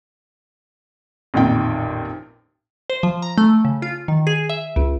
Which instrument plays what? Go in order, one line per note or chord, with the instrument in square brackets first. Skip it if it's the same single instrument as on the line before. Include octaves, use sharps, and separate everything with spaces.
[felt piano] A1 F2 A#2 D#3 G5
[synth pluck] C5
F3
A#5
A3
C#3
F4
D#3
G#4
E5
C#2